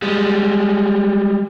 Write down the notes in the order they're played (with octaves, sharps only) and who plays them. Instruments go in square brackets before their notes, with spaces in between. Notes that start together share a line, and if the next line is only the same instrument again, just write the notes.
[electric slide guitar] G3 G#3